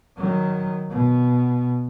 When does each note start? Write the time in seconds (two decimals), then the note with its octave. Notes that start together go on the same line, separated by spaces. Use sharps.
0.16 D#3 F#3
0.90 B2